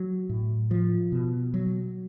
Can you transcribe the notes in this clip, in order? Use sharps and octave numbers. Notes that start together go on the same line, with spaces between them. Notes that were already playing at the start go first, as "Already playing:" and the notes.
Already playing: F#3
A2
F3
B2
F#3